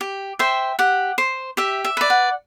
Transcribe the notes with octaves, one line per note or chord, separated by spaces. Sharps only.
G4
C5 E5 G5
G4 F#5
C5
G4 E5
E5
B4 D5
F#5